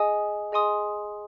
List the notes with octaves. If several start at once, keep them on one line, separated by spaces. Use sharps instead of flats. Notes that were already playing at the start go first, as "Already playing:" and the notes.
Already playing: G#4 D#5 G#5 D#6
G#4 D#5 G#5 C6 D#6